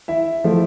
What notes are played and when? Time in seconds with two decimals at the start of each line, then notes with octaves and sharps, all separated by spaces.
0.08 E4 E5
0.44 F3 A3 E4